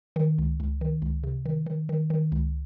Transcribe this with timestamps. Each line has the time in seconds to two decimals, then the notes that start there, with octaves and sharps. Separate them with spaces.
0.16 D#3
0.38 C#2
0.60 C#2
0.81 D#3
1.02 C#2
1.23 C3
1.45 D#3
1.66 D#3
1.89 D#3
2.10 D#3
2.32 C#2